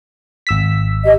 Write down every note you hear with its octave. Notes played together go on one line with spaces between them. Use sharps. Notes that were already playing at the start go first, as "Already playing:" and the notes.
G#1 E6 B6
G4 D#5